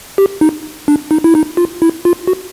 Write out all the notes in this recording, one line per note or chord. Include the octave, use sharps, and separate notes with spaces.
G4
D#4
D4
D#4
E4
D#4
F4
E4
F4
F#4